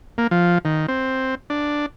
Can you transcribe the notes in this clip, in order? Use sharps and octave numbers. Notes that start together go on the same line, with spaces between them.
A#3
F3
D#3
C4
D4